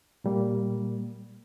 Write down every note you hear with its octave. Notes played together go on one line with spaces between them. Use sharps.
A#2 G3 A#3